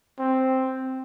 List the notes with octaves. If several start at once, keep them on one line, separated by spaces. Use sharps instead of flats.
C4